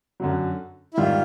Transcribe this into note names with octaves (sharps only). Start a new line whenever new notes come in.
F#2 D3 F#3
E4
G#2 D#3 G3 F4